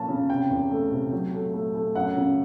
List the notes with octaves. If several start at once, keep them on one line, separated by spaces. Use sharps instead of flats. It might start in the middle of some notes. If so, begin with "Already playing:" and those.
Already playing: F3 A#3 C#4 A5
C#3
C3 G5
E2
A3
C3
F#3
A3
A3
A3
F#2 F#5
C#3